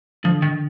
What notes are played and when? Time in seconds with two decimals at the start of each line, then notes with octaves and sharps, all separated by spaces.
0.24 D3 F3
0.42 D#3